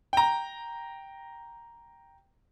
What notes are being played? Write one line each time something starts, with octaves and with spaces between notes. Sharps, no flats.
G5 A#5